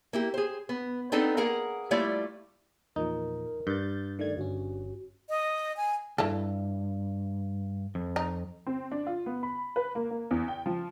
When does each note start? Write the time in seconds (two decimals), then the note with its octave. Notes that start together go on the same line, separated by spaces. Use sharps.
0.13 A#3 E4 G4
0.34 G#4 C5
0.69 B3
1.12 B3 C4 D4 D#4 A4
1.37 A#3 G#4 A#4 F#5 A#5
1.91 G3 A3 A#3 E4 F4 D5
2.96 E2 A#2 F3 D#4 A#4
3.67 G2 G6 A6
4.19 D#3 A3 D5 G#6
4.37 G1 C#4 F#4
5.29 D#5
5.77 G#5
6.18 D2 G2 E4 F4 A4
7.95 F2
8.16 D#4
8.67 C4
8.92 D4
9.07 F4
9.26 B3
9.43 B5
9.76 B4
9.95 A#3
10.11 A#3
10.31 E2
10.48 G5
10.66 F3